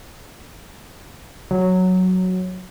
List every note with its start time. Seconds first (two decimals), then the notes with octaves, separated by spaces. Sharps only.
1.51 F#3